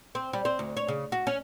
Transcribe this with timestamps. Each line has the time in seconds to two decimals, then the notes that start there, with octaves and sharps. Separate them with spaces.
0.15 C4
0.33 G3
0.45 C4
0.59 D2
0.77 C#5
0.88 C#3
1.12 F#4
1.27 C#4